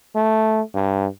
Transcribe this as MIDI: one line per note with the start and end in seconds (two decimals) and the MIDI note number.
0.16 0.61 57
0.74 1.06 43